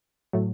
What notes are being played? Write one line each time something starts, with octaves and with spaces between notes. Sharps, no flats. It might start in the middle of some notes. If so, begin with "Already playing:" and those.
A2 F#3 A3